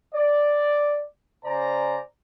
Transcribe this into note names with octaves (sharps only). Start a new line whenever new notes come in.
D5
C#3 C5 D5 G#5 A#5